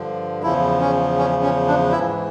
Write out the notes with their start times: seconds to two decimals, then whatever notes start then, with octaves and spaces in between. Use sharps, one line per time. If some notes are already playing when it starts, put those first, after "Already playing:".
Already playing: G2 D3 F3
0.43 E2 C#3 F3 E4
0.80 C#4
1.18 C#4
1.43 C#4
1.68 D4
1.92 G#2 E3 E4